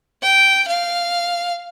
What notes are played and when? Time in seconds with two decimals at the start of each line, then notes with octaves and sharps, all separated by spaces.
0.22 G5
0.68 F5